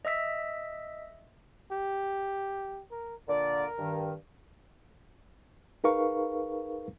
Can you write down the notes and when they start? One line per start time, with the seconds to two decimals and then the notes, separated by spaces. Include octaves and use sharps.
0.05 D#5 E5 E6 B6
1.72 G4
2.91 A#4
3.29 A#2 D3 A#4 D5
3.78 G2 D#3
5.84 D#4 G#4 A#4 B4 F5 C#6